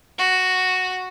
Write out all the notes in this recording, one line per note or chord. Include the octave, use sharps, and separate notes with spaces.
F#4